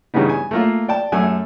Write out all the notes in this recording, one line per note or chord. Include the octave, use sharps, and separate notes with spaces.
G2 C#3 E3 G3 B3 D#4
G#5
A3 A#3 F4
D5 G5 A5
F#2 A3 A4 G#5